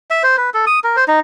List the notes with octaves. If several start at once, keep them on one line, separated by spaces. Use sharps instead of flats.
E5
C5
B4
A4
D#6
A#4
C5
D#4